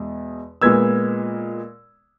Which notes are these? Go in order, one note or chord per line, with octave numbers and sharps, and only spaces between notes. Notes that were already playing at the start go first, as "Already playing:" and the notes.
Already playing: E2 B2 G#3
A#2 G#3 B3 E6 G#6